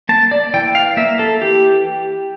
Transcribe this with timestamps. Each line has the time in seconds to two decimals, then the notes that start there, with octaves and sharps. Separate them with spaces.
0.09 A#3 A5
0.31 D5
0.54 E3 G5
0.75 F5
0.97 A#3 E5
1.19 A4
1.41 E3 G4